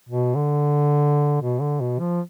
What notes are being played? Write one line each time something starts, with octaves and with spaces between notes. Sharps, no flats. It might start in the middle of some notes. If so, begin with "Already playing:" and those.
B2
D3
B2
D3
B2
F3